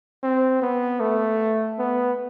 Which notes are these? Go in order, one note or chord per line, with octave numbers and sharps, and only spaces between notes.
C4
B3
A3
B3